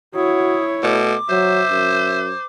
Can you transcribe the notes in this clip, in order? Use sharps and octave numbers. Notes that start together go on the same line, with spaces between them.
E4 F#4 C#5 D#6
B2 A3 D6
F#3 C5 E5
F#2